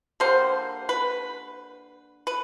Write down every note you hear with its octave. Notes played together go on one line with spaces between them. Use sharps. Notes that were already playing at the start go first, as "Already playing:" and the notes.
D3 G3 A#3 C5
B4
B4